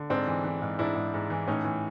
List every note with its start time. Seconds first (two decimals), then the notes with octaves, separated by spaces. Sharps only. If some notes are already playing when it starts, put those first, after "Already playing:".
Already playing: D3
0.10 G#2 C4 D4
0.27 E3
0.44 E3
0.62 G#2
0.79 G#2 D4 E4
0.95 G#2
1.14 G#2
1.30 E3
1.47 A2 C#4 D#4
1.65 E3